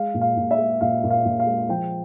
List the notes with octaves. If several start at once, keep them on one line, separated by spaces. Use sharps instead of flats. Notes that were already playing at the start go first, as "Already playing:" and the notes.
Already playing: G#3 F5
A#2
F5
A#2
E5
G#3
A#2 F5
A#2
F5
A#2
F5
G#3
F3 G5